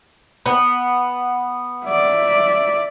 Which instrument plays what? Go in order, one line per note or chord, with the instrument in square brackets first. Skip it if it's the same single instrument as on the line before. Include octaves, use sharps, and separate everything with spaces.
[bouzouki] B3
[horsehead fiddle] D5 E5